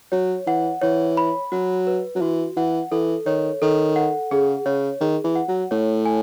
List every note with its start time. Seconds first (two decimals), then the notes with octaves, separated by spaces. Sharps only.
0.12 F#3 C#5
0.47 E3 F#5
0.82 E3 C#5
1.17 B5
1.52 F#3 F#4
1.87 B4
2.15 F#3
2.21 E3 F#4
2.57 E3 F#5
2.91 E3 A4
3.26 D#3 C#5
3.62 D#3 A4
3.96 F#5
4.31 C#3 G#4
4.66 C#3 C#5
5.01 D#3 G#4
5.24 E3
5.36 F#5
5.48 F#3
5.71 A2 C#5
6.05 G#5